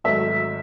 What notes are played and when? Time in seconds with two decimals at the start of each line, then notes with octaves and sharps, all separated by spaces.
0.04 G#1 G#2 F#3 A3 E5